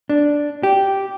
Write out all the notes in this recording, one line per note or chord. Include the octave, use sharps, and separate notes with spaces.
D4
G4